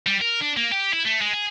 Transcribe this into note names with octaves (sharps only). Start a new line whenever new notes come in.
G3
A#4
D4
A#3
G4
E4
A3
G#3
G#4